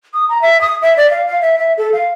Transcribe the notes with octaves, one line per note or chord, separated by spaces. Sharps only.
D#6
A#5
E5
D#6
E5
D5
F5
F5
E5
E5
A4
F5